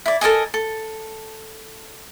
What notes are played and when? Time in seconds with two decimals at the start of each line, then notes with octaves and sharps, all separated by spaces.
0.06 E4 D5
0.21 A4 A#4 D#5 G#5
0.54 A4